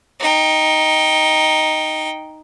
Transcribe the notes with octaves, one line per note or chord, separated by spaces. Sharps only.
D#4 G5